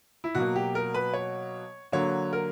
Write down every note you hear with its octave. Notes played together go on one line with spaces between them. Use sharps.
E4
B2 F#3 A#3 F#4
G4
A#4
B4
C#5
D3 F#3 A#3 C#5
A#4